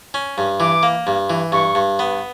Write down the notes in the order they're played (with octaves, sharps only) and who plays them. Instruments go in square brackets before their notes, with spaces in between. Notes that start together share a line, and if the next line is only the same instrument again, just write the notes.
[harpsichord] C#4
G2
[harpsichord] E3 [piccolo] D6
[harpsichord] A#3
G2
E3
[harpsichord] G2 [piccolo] C#6
[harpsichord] G2
B3